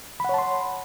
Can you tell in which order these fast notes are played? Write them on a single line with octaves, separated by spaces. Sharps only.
B5 F#5 C#5 A5 C6